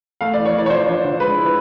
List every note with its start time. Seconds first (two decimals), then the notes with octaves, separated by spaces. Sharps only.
0.21 A3 F5
0.33 D5
0.38 E3
0.46 C#5
0.54 E3 D5
0.66 C#5
0.70 F3 C5
0.88 D4
1.04 D3
1.20 G#3 B4
1.37 E4